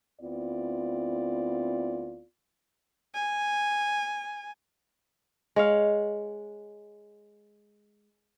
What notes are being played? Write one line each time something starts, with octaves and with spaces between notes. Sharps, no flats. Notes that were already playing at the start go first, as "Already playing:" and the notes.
D2 B3 C4 E4 F4 D5
G#5
G#3 C#5 F5